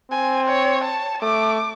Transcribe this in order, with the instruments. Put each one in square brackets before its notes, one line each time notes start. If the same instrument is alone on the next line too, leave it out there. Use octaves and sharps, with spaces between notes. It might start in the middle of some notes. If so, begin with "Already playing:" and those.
[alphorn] C4 [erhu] G#5
[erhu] C#5
A5
[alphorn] A3 [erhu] D6